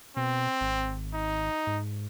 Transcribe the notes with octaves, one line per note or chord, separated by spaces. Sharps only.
B2 C4
G#1
D#4
G#2